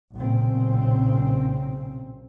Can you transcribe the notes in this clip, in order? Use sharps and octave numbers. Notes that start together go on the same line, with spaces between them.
B1 A#2 C#3 C4